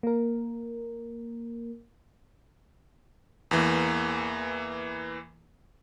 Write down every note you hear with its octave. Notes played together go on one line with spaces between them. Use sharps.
A#3 A#4
E2 E3 A#3